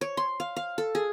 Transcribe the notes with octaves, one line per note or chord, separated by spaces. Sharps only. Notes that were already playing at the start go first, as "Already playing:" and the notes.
C#5
C6
F5
F5
A4
G#4